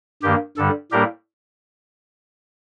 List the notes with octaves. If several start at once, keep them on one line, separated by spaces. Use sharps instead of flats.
G2 D#3 A#3 G4
G2 D3 G3 A4
A2 G3 A#3 D4 G4 A#4